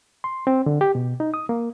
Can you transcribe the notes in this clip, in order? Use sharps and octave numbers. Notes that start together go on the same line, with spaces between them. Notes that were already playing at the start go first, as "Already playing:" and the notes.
C6
C4
D3
G4
B2
D#4
D#6
A#3